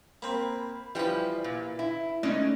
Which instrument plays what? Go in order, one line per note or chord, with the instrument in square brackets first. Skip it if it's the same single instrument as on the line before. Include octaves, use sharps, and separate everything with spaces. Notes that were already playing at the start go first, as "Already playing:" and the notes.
[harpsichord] A#3 C4 [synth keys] B5
[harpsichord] E3 B4 [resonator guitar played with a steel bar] F3 G3
[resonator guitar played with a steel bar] A#2
E4
[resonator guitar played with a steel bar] G#3 D#4 D5 [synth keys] A3 C#4